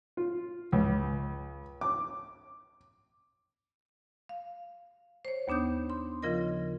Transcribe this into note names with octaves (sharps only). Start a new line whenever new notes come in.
F4
C#2
D6
F5
C5 C#5
D#2 B3 D4 D#6 G6
C6
C#3 F3 F4 A#4 D#5 A#6